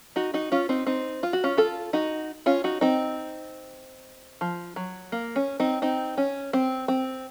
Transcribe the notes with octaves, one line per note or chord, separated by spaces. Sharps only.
D#4 F#4
D#4 F#4
C#4 F4
C4 D#4
C4 D#4
F4
F#4
C#4 F4
F4 A4
D#4 F#4
C#4 F4
D#4 F#4
C4 D#4
F3
F#3
A#3
C#4
C4 D#4
C4 D#4
C#4
C4
C4